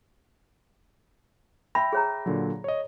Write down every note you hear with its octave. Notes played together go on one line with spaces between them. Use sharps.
E5 G5 B5 A#6
G#4 C#5 A#5
A#2 D3 F#3
C#5 D#5